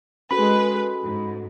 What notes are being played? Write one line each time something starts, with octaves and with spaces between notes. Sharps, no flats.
G#3 C#4 F#4 A4 B4 B5
G#2